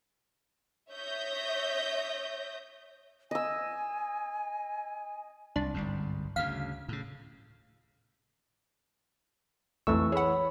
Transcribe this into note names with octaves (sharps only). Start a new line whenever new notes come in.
C#5 E5 D#6 G6 A#6
D#5 G#5 E6
C2 D4
G1 C2 G#2
D2 C#3 F5 B6
A2 C#3
B1 F2 E3 A3 C#6 E6
G#4 C#5 F#5 B5